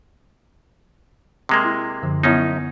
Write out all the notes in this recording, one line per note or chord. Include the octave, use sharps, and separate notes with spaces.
C3 G#3 A#3
E4
F#2 D3 F3
F#2 B3 C#4 D#4 E4